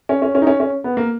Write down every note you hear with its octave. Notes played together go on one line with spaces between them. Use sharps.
C#4
C#4
C#4
D#4
C#4
C#4
B3
A#3